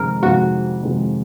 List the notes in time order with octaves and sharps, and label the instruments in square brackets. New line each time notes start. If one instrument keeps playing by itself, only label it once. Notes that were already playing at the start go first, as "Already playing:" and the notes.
Already playing: [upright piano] F2 C3 D#3 G#3 [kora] A#4
[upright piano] F2 C3 D#3 G#3 [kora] F#4
[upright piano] F2 C3 D#3 G#3